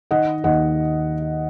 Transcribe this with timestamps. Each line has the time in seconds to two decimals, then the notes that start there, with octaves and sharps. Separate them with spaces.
0.11 D#3 D#5 F#5
0.44 D#2 D#5 F#5